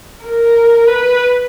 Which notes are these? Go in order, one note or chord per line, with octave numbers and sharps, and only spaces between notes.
A#4
B4